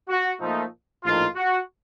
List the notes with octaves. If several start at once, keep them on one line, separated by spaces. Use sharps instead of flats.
F#4
A#2 F3 A3 D#4
A#1 A2 F3 A#3 D#4 F4
F#4